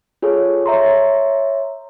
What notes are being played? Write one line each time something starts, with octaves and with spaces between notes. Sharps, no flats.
F4 G#4 A4 C#5
C#5 E5 A#5 C6